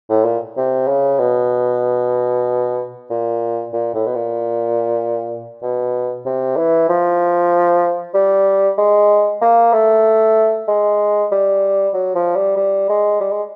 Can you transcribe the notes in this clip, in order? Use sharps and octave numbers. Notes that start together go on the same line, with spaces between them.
A2
A#2
C3
C#3
B2
A#2
A#2
A2
B2
A#2
B2
C3
E3
F3
G3
G#3
A#3
A3
G#3
G3
F#3
F3
G3
G3
G#3
G3
G#3